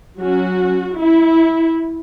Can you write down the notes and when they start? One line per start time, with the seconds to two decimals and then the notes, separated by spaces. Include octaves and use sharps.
0.20 F#3 C#4 F#4
0.97 E4